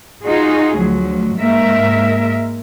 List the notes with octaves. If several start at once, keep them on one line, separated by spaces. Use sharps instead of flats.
D#4 F4 F#4 G#4
D2 F3 F#3
G#2 G#3 A#3 A#4 E5